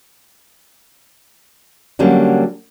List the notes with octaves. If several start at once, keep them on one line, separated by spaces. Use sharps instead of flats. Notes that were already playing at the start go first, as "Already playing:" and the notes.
D3 F#3 G3 A#3 C#4